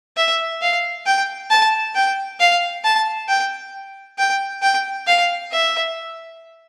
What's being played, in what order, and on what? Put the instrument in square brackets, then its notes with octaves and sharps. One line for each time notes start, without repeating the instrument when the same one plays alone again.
[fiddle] E5
F5
G5
A5
G5
F5
A5
G5
G5
G5
F5
E5